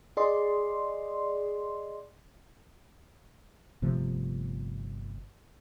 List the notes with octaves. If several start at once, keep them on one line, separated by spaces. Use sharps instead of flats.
G#4 D5 D#5 C6
G1 C3 F3 A3